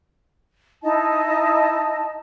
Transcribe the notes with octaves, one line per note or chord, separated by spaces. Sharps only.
D#4 E4 D#5 A5